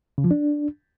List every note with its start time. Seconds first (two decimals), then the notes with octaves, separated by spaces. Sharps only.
0.18 C#3
0.24 F3
0.31 D4